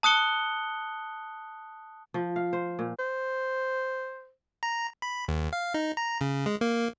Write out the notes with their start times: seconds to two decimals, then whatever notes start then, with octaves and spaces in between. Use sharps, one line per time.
0.03 A5 D#6 F#6 C#7 G7
2.14 F3
2.36 F5
2.53 C5
2.79 A#2
2.99 C5
4.63 A#5
5.02 B5
5.28 D#2
5.53 F5
5.74 D#4
5.97 A#5
6.21 C#3
6.46 G#3
6.61 A#3